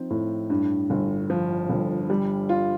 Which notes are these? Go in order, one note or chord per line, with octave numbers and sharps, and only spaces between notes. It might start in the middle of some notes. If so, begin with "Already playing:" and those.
Already playing: F3 C4 D#4
A2
G2
G1
F3
G1
G3
F4